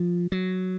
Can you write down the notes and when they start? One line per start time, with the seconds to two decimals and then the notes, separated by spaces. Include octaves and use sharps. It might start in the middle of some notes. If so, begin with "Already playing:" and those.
Already playing: F3
0.32 F#3